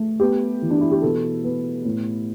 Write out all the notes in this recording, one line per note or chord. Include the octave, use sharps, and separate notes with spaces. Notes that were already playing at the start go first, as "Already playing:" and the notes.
Already playing: A3
B3 G4
E3
D4
E4
G4
B2 A4
B3
A2